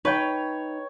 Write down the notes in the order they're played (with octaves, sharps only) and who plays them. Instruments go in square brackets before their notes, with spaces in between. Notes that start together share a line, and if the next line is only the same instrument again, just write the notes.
[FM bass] D#4 [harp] B4 G5 [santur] C#5